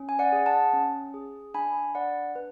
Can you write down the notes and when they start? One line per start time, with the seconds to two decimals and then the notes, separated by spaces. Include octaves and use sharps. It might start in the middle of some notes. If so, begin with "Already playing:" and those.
Already playing: C#4
0.09 G#5
0.19 D5 F#5
0.32 G#4
0.46 F#5 A5
0.73 C#4
1.14 G#4
1.54 D4 G#5 B5
1.95 D4 D5 F#5
2.36 D4 B4